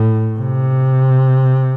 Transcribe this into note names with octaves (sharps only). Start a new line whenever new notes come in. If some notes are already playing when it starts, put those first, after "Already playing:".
Already playing: A2
C3